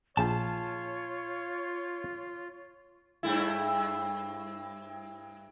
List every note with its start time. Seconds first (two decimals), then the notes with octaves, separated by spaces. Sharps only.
0.17 A#1 F4 G#4 C#5 G5 A5
3.23 G2 A3 E4